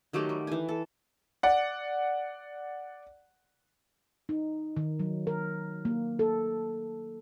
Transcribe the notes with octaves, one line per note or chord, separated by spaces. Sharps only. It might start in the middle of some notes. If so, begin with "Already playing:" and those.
D#3 F#3 A3 G4
G3
E3 G#5
A4
D5 F#5
D#4
D#3
F#3
A#4
A#3
A4